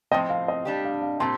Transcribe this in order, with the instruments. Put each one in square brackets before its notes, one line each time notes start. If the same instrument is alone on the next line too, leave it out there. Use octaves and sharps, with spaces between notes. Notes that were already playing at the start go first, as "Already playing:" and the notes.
[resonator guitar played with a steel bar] A2 F3 C4 [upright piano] D#5 G5
[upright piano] F5
D#5
[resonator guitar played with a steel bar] G3 D4 G4
[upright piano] F5
F5
[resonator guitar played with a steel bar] A#2 G3 C4 [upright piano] A5 C6